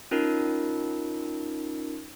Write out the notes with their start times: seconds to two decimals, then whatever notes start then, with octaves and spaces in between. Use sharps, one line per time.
0.11 C#4 D#4 F4 A#4